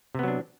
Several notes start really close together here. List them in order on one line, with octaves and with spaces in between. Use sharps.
C3 B3 F#3 D4